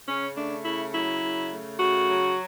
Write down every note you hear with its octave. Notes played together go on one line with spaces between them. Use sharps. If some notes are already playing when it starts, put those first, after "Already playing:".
C#3 C#4
A3 D4
C#3 E4
F#3 E4
C#3
A3
C#3 F#4
F#3